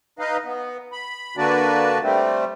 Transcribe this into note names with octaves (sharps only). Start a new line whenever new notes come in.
D#4 B4 D#5 F5
B3
B5
D3 A#3 D4 F#4 B4 D5
G3 A3 C4